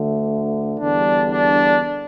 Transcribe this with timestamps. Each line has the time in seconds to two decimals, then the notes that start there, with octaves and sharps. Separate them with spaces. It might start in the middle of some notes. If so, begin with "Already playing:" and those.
Already playing: D2 D3 A3
0.79 E2 D3 G3 D4
1.33 D4